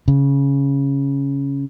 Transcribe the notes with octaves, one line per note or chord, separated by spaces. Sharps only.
C#3